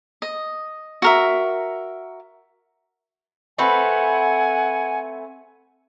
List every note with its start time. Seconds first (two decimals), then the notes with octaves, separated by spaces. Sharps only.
0.22 D#5
1.02 F#4 A#4 E5
3.58 A3 C4 B4 F#5 G#5